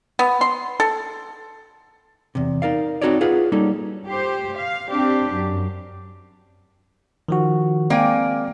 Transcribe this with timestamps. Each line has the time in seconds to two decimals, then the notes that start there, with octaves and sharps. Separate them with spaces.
0.19 B3
0.41 C6
0.80 A4
2.35 E2 C3
2.62 D#4 A#4 D5 F5
3.02 C4 D#4 F#4 A4 C#5 D5
3.21 F4 G#4 B4 F#5
3.52 G3 A#3 C#4 D#4 A4
4.08 G4 C5
4.57 F5
4.90 C4 D4 G4
5.31 F#2
7.28 D#3 F3 F#4
7.90 G#3 A#3 C4 D5 G5 G#5